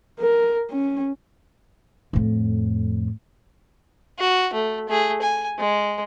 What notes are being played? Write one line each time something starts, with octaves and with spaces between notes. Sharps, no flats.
A#4
C#4
F2 A2
F#4
A3
A3 G#4
G#5
G#3